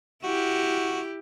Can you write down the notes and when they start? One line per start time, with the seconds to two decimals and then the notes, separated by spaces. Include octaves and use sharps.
0.24 E4 F#4 G4